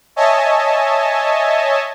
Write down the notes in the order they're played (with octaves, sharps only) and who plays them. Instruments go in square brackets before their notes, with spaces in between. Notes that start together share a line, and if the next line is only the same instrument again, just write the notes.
[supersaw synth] C#5 D#5 E5 G#5 A5